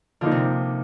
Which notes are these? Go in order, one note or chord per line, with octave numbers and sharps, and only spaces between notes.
D3 F3 A#3 D#4
C3